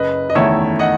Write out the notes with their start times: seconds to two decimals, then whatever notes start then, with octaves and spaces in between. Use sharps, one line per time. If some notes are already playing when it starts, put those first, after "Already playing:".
Already playing: F#1 B4 D#5
0.30 D#5
0.35 E2 D#3 A3 E4 C#5 E5
0.79 D#5 F#5